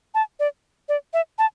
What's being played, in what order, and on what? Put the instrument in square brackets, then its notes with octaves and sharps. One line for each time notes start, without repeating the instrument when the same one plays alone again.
[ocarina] A5
D5
D5
E5
A5